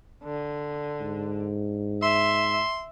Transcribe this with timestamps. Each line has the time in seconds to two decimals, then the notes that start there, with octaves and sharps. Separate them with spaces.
0.24 D3
1.01 G#2
2.03 E5 C6